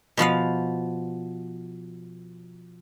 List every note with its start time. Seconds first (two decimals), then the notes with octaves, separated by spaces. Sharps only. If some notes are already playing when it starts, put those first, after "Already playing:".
0.17 B2 F3 B3 F5